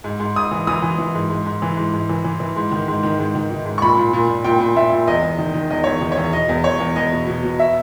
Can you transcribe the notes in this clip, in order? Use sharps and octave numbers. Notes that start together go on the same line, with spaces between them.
G#2
G#2
G#2 D#6
E3
E3 D#6
E3
E3
G#2
G#2
G#2
E3
G#2
G#2
E3
E3
E3
G#2
D#3
G#2
D#3
G#2
D#3
D#3
G#2
C#6
A#2 B5
A#2
A#2
A#2
A#2 G5
A#2
A#2 E5
A#2
E2 D#5
E2
D#3
D#3
E2 D#5
E2 C#5
D#3
C#5
E2
B2 D#5
E2
E2 C#5
E2
E2 D#5
B2
B2
B2
E5